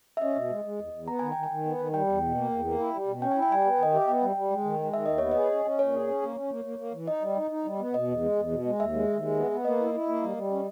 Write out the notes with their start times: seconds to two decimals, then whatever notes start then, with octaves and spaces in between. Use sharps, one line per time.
0.17 E5
0.22 C#4 D#5
0.36 B2
0.50 G#3
0.64 G#3
0.79 E2
0.93 E2
1.07 B3 A#5
1.19 D#3 G#5
1.32 D#3 G5
1.43 G#5
1.50 D#3
1.65 B3
1.79 D#3
1.93 G3 G5
2.07 E2
2.22 B2
2.36 A#3
2.50 E2
2.65 A#3
2.79 E4
2.93 G3
3.07 B2
3.21 C#4 G5
3.31 E4 G#5
3.42 G5
3.50 G3 G#5
3.62 B3 G5
3.79 D#3 D#5
3.94 G4 E5
4.08 B3 G5
4.22 G3
4.36 G3
4.51 G#3
4.64 D#3
4.79 G#3
4.93 D#3 E5
5.06 D#2 D#5
5.18 B3 C#5
5.32 G#4 D#5
5.51 C#4
5.65 C#4
5.79 A#2 C#5
5.94 G#4
6.07 C#4
6.22 A#3
6.36 C#4
6.51 A#3
6.64 A#3
6.79 A#3
6.94 E3
7.07 D#4 D#5
7.22 G3
7.36 D#4
7.51 D#4
7.65 G3
7.80 B3
7.94 B2 D#5
8.08 E2
8.22 G#3
8.36 E2
8.51 B2
8.66 G#3
8.79 D#2 E5
8.93 G#3
9.08 D#2
9.22 G#3
9.37 B3
9.51 B3
9.65 A#3 D#5
9.80 E4
9.94 E4
10.08 A#3
10.22 G3
10.37 G3
10.51 C#4